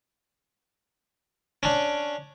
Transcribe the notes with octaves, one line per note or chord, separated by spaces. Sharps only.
C#4 D4